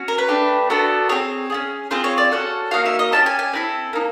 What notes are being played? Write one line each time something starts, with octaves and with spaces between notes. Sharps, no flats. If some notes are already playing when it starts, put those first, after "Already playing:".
Already playing: C#4 F#4
A#4
B4
A3 D4 G4
B3 D4 F#4 A4
C4 F4 G#4 C#5
C#4 F4 G#4
C4 F4 G#4 C5
C#5
D5
C#4 F#4 A4 F#5
A#3 D#4 F#4 F5
E5
D#5
C#4 E4 G4 A5
G#5
G#5
C4 E4 A4
A#3 D#4